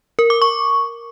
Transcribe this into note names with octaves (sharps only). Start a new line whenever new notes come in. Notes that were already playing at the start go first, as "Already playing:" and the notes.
A#4
D6
C#6